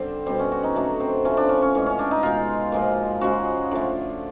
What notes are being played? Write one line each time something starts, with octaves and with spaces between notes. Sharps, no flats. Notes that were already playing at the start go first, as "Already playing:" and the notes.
Already playing: D3 G3 C4
B2 G3 C4
C#4
F#4
D#4
D3 F#3 A3 D4
C4
C3 F3 A3 C#4
D4
C#4
C#4
A2 E3 G#3
C#4
D4
D#4
B2 G#3 F4
A#2 F3 G#3
C#3 F3 G#3 F#4
D3 F3 A3